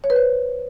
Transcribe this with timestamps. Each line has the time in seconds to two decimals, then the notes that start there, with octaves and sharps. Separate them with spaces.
0.04 C#5
0.10 B4
0.16 C5